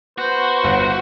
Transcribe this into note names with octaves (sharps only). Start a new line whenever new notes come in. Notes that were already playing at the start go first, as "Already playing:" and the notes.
B3 F#4 C5
G1 F5 F#5